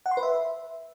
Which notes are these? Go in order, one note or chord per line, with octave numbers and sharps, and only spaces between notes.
F#5
C6
B4
E5